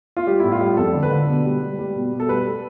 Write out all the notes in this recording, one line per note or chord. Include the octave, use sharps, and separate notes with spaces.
F4
G3 G4
A2 E4
F4
G3
F2 A4
D3
B4
D3
B2
G3
G3
G3
B2
B2
A4
G3 B4